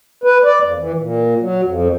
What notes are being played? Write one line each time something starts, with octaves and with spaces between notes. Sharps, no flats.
B4
D5
F2
E3
A#2
F#3
F2